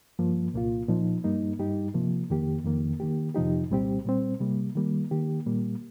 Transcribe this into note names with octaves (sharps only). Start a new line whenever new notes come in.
G2 F3 A#3
C2 A#2 A#3 F4
A#2 F3 D#4
G2 G3 A#3 D#4
G2 G3 D#4 G4
C3 F3 A#3
F2 D#3 A#3 G4
F2 D#3 A#3
D#3 A#3 G4
F2 C3 F3 D#4 G4
C2 A#2 G3 C4 G4
A#2 G3 C4
C3 G3 A#3
D#3 G3 A#3
D#3 A#3 G4
A#2 G3 A#3